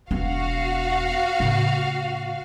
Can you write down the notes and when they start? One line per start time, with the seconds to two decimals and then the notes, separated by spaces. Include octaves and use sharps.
0.11 E1 B3 F#4 F5
1.40 A2 C#3